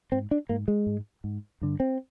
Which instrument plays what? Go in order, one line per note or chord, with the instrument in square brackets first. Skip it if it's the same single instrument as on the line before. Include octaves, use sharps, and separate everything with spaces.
[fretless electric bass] G#2 C4
D4
G#2 A#3
G#3
G#2
G#2
G2 D3
C4